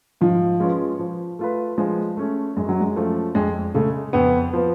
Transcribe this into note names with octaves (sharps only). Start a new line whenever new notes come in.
G#2 F3
G#3 C#4 F4 B4
F3
A3 F4 B4
F3 G#3
A3 C#4 G#4
F#2 G#3
F#3
G#3
F3 A3 C#4
F2 G#3
C#3 G#3 A3
F2 B3
F3 B3